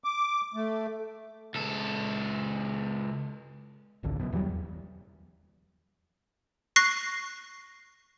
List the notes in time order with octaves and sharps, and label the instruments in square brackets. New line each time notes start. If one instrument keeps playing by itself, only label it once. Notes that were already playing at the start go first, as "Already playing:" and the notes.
[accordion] D6
A3
[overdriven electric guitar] C#2 A4
[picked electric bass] G#1 C#2 D3
F1 F#2 B2
D#2 E3 F#3 G3
E2
[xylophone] C#6 F#6 A#6 C7